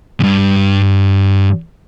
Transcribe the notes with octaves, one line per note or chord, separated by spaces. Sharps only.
E2 G2